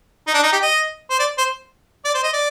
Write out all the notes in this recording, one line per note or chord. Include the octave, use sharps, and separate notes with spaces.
D#4
D4
D#4
G4
D#5
C5
D5
C5
D5
C5
D#5
D5